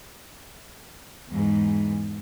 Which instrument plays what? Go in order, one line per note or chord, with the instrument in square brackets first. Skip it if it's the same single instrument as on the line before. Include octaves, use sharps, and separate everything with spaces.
[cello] E2 G#2